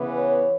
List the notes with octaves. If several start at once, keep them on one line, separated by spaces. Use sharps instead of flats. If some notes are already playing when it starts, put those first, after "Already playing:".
Already playing: C#3 E3 B3
C#5